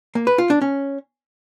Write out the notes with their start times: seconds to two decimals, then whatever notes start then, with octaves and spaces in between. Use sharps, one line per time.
0.15 A#3
0.27 B4
0.38 F4
0.50 D4
0.62 C#4